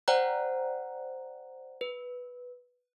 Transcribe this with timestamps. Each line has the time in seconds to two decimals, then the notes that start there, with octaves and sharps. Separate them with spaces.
0.08 C5 D5 F#5 G5 A#5 F#6
1.81 B4